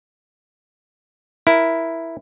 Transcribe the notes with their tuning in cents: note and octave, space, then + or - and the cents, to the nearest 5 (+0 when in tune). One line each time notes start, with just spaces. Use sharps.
E4 +0 A#4 +10